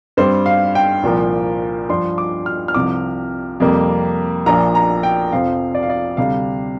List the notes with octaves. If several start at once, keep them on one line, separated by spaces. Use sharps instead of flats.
G2 G3 C4 C5
F5
G5
C2 A#2 F3 A#3
G2 F3 D4 C6
D6
F6
F6
C2 C3 F3 D6
F2 C3 G3 A#3
A#1 A#2 F3 A#3 D4 A#5
A#5
G5
F2 C3 F3 C4 F5
D5
F5
D5
D2 C3 G3 F5